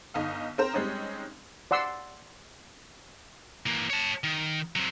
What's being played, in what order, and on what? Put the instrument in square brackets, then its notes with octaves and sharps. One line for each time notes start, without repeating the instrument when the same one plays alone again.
[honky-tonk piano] G1 D#4 F5
C4 A#4 C5 A#5
G3 G#3 C4 C#4 D#4
[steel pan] D5 F#5 C6 E6
[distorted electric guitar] E3 A#3
C#5 A5
D#3
F#3 C4